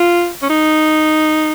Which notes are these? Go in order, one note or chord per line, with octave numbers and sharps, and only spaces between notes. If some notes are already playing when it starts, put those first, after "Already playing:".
Already playing: F4
C#4
D#4